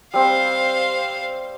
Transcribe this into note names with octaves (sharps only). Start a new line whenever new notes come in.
G3 C4 C5 F5